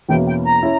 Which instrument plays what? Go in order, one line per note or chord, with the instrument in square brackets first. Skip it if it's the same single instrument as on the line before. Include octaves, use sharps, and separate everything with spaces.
[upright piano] E2 B2 A#3 C#4 E4 [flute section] G5
[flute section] G5
A#5
[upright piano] C#4 E4